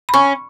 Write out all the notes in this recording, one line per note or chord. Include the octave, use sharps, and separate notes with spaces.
B5
C#4 C#6